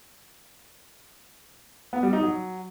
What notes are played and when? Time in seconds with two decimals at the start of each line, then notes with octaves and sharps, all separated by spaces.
1.93 B3
2.03 G3
2.13 D#4
2.23 F#3